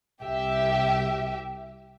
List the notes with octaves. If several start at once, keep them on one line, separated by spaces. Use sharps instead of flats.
C2 G4 E5